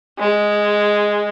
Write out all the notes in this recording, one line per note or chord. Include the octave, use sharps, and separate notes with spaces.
G#3